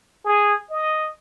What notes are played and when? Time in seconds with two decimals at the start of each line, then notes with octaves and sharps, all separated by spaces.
0.25 G#4
0.70 D#5